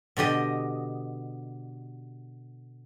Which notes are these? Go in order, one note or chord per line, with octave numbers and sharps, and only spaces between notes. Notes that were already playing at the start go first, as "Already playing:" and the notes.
B2 D3 G4 D#5